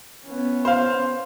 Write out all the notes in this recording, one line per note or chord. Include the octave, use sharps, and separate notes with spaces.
B3 C#4
C5 F5